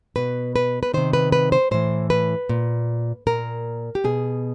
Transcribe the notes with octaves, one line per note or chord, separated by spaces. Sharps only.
B2 B4
B4
B4
C3 D#3 C5
B4
B4
C5
A2 E3 C5
B4
A#2
A#2 A#4
G4
B2 G#4